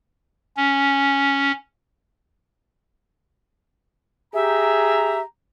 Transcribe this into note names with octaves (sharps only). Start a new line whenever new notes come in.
C#4
G4 G#4 E5 A#5